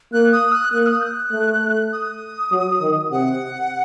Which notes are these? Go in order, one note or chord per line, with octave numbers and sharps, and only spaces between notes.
A#3 F#6
D#6
F#6
A#3 F#6
D#6
G6
F#6
A3
D#6
F#3
D#3
C3 F#5